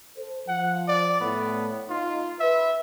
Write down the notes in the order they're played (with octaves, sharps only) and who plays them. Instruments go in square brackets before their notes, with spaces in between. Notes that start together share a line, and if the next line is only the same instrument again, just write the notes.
[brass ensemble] A4 C5
[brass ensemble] F3 [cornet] F#5
[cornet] D5
[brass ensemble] A2 [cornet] B3
[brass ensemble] D#4 [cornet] F4
[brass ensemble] B4 [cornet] E5